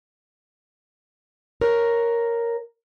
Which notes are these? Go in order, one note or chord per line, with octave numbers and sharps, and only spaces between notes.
A#4 C#5